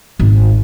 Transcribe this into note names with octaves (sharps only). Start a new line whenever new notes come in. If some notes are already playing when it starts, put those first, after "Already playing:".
G#1